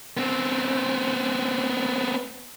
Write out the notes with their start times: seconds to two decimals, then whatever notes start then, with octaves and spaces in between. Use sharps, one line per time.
0.17 B3 C4